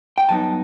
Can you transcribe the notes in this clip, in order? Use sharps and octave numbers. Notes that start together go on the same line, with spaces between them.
G5
G2 F#3 B3 D#4 A5